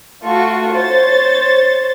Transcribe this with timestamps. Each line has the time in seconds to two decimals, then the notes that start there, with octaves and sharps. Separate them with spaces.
0.25 A3 F4 F#4 C#6
0.73 C5 C#5 A6